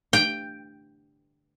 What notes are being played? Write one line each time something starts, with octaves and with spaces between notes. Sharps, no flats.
G5